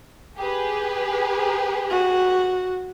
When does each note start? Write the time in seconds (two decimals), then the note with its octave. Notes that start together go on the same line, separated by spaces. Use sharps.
0.38 G4 G#4 B4
1.90 F#4